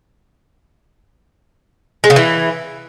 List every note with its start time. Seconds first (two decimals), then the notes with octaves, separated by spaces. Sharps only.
2.04 G#3
2.10 C#3
2.16 E3